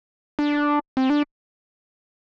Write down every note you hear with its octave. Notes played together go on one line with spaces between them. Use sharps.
D4
C4
D4